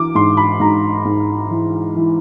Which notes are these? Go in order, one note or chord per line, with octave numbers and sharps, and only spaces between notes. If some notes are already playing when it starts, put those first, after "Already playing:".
Already playing: E3 D6
G#2 C6
B5
G#2 A#5
G#2
E3
E3